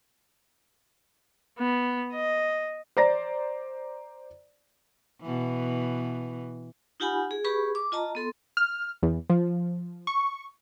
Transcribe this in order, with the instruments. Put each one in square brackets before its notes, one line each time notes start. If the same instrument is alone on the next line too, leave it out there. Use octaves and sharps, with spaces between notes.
[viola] B3
D#5
[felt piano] C5 D5 A#5 A#6
[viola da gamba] B2 E3
[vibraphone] D#4 F4 G4 F#5 G#5 B5
G#4
G4 G#4 B4 B5 C#6
D6
F4 D#5 A5 A#5
B3 A4 C6
[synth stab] F6
E2
F3
C#6